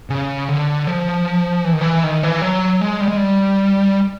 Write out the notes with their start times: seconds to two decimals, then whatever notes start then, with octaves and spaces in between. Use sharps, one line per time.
0.10 C#3
0.49 D3
0.87 F3
1.64 E3
1.73 D#3
1.81 E3
2.03 D#3
2.23 E3
2.42 F#3
2.81 G#3
3.01 G3
3.08 G#3
3.17 G3